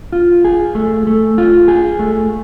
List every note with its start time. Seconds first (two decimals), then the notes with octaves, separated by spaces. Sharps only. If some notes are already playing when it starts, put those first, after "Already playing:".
0.13 F4
0.45 G#4
0.75 A3
1.07 A3
1.38 F4
1.68 G#4
1.99 A3